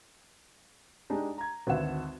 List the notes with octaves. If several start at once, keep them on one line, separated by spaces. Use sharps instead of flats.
G#3 D4 D#4 G4
A#5 G#6
G#1 D2 B4 E5 F#5 E7